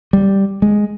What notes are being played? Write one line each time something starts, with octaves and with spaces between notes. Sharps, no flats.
G3
G#3